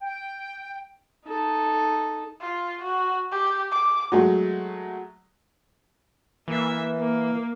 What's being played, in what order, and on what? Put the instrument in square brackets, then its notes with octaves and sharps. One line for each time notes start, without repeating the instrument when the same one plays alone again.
[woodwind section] G5
[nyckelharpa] D#4 A4
[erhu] F4
F#4
G4
D6
[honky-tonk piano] F#3 G#3 A3
[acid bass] E3 [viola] A#3 E5
[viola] A#3